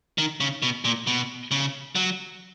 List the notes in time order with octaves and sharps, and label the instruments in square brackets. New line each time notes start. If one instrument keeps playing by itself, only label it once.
[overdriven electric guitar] D#3
C#3
B2
A#2
B2
C#3
F#3